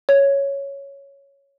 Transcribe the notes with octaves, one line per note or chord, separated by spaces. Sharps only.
C#5